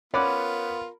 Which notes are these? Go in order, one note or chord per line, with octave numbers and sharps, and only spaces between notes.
B3 C#4 F4 A#4 D5 F#5 B5